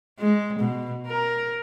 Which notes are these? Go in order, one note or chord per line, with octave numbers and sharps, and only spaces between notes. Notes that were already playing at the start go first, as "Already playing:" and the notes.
G#3
B2
A#4